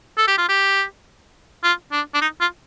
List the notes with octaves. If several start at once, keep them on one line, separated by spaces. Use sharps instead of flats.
A4
G4
F4
G4
F4
D4
D4
D#4
F4